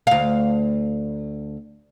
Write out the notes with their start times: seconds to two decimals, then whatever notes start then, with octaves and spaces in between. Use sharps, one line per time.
0.07 D2 F5